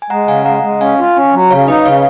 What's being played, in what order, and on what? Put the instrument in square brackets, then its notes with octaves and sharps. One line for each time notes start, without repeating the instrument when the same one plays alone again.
[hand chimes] G#5
[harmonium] G#3 [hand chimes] F#5 A#5
[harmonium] C#3 [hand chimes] F5 G#5
[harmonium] G#3 [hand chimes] F#5 A#5
[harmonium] G#3
[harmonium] C#4 [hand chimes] F5 G#5
[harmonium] F4
C#4
F#3
[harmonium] C#3 [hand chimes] C#5 F5
[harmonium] D#4 [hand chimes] B4 D#5
[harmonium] C#3 [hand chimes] C#5 F5